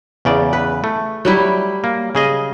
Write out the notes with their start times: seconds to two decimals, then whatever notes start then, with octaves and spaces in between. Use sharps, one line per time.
0.25 E2 C#3 D5
0.53 B4
0.84 A3
1.25 F#3 G3 E4
1.84 A#3
2.15 C#3 G#4 D#5